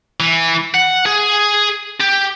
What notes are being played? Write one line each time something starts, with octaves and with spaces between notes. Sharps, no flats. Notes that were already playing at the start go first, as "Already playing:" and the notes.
E3
F#5
G#4
G4